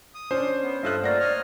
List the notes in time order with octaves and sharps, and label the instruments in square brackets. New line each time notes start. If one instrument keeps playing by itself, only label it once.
[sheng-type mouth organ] D#6
[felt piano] C#4 D4 [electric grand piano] C5
[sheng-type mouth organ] B3
[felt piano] G2 A4 F#6 [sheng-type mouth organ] F4 D#5 E5
[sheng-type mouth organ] A3 A#3 F4 [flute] D5 [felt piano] F#5 A#6
[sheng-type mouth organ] C#5 D#5 F6